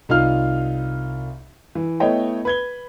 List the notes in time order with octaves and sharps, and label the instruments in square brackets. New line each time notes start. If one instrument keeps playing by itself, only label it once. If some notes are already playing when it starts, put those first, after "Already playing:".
[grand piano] C2 D#4 F4 F5 F6
E3
A3 B3 E4 C#5 D#5 G5
B4 G#6 G7